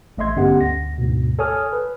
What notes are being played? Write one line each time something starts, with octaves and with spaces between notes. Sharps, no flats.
A1 A3 D#5 E5 C6 G#6
G2 D3 B3 C#4 G4 F#5
D2 A#6
D2 G#2 B2
A4 C#5 G#5 D#6 F6
B4